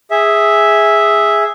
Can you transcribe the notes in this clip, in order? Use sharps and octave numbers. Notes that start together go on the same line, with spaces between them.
G#4 E5